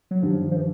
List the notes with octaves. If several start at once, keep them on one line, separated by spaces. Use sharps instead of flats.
F#3
G2 D#3 F3 G3
F3
E3